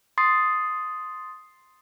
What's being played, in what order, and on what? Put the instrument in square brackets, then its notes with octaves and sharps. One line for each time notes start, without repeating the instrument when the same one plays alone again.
[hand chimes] C6 D#6 A6 C7